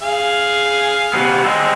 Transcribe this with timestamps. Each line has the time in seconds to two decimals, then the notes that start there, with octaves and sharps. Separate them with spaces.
0.03 G#4 F5
1.13 C3 B3
1.44 G#3 C4